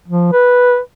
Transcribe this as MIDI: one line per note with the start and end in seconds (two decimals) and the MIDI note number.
0.08 0.30 53
0.33 0.79 71